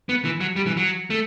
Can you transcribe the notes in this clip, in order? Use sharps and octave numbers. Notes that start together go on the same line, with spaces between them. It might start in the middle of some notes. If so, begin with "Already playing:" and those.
B3
E3
F#3
G3
E3
F#3
A3